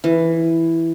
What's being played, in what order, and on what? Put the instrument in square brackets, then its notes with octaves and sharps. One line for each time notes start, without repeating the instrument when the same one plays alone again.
[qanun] E3